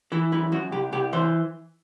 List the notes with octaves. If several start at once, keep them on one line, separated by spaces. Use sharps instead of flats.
E3 E4
F#2 E4
F#2 F#4
C2 G4
C2 G4
E3 C5